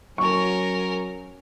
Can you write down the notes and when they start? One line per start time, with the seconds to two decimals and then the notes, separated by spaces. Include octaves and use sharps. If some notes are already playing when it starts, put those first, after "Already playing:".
0.18 F#3 C#4 A#4 C#6